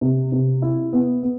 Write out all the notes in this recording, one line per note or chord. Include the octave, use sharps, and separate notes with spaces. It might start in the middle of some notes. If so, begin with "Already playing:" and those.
C3
C3
E4
B3
B3